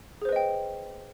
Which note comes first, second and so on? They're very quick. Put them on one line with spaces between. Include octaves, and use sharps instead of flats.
G#4 C5 B4 D#5 G5